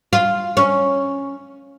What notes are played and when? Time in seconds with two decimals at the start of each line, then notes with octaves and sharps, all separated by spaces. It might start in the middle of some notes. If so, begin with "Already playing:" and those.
0.13 F4
0.57 C#4